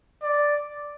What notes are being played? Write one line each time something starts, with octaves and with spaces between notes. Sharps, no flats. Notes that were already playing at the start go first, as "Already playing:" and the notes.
D5